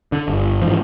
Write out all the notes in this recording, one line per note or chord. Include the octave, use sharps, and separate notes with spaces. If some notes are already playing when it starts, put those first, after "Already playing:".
D3
G1
G#2 E3 F3